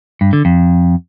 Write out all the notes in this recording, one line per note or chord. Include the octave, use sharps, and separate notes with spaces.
G2
D3
F2